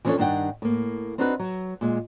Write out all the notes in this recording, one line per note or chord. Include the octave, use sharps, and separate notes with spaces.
E3 F3 C#4 D4 A4 C#5
G2 D#3 D4 E4 F#5 G5
A2 A#3
C4 D4 D#4 F#4 A#4 B4
F#3
A#2 G#3